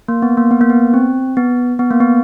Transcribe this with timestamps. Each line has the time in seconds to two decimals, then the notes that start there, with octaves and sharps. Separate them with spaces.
0.08 A#3
0.22 B3
0.37 A#3
0.51 B3
0.61 A#3
0.70 B3
0.94 C4
1.37 B3
1.79 B3
1.91 A#3
2.00 B3